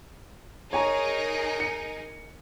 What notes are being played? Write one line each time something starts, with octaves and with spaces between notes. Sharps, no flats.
D#4 G#4 A#4 C#5 G#5 A#5
C#7